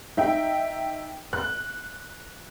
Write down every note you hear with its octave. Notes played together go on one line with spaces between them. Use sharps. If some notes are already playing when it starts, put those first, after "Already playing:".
D#4 E5 G5
F#6